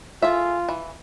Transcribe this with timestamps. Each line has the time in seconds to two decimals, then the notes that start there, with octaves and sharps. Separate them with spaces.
0.22 F4 G#4 A4 E5
0.69 E3